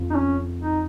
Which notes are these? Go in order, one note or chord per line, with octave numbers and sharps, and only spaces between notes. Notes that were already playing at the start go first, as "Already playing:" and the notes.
Already playing: F2
D#4
C#4
D#4